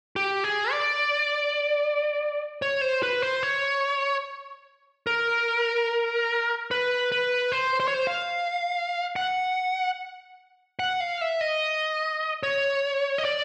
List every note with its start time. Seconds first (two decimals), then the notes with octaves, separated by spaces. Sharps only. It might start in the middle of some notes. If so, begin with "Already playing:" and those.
0.16 G4
0.44 G#4
0.71 D5
2.62 C#5
2.81 C5
3.03 B4
3.22 C5
3.43 C#5
5.07 A#4
6.71 B4
7.12 B4
7.52 C5
7.80 C5
7.88 C#5
7.94 C5
8.07 F5
9.16 F#5
10.79 F#5
11.00 F5
11.21 E5
11.41 D#5
12.43 C#5
13.18 D#5
13.25 D5